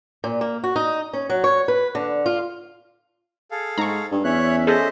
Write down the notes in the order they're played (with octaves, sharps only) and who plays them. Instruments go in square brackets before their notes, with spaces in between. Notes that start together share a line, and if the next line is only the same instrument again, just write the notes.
[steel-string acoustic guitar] A#2
A#3
F#4
D#4
C#4
F#3
C#5
B4
D3
F4
[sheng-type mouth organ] G#4 A4 F5
[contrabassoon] G#2 [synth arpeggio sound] A#5 C#6
[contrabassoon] G2
[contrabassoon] E2 [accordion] C#4 E5 [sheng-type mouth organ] C#5 F#6
[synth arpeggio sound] G#4 A4 [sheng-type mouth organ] C5 D#5